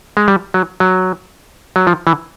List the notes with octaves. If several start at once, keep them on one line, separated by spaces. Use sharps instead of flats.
G#3
G3
F#3
F#3
F#3
F3
E3